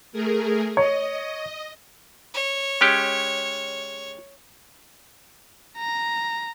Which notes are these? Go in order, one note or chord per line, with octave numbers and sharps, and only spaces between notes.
A3 G#4 A#4
C#5 D#5
C#5
G#3 C#4 G4
A#5